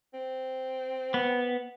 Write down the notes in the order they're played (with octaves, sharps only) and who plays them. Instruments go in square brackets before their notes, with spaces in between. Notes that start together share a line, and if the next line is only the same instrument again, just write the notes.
[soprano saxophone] C4
[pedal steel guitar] B3